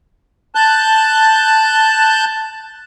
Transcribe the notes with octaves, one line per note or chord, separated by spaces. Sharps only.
A5 F#6 G6